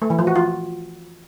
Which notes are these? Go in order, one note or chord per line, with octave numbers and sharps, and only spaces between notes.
A3
E3
F3
F#4
F4